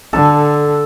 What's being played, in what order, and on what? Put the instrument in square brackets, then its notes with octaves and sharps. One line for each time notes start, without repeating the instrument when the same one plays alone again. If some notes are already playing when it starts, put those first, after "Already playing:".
[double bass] D3 [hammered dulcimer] A4